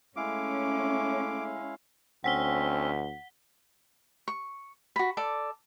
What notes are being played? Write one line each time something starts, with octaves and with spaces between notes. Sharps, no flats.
G#3 A3 C#4 E4 F5 D6
D2 C4 C#4 F#5 B6 G7
C#6
F#4 B5
A4 D5 D6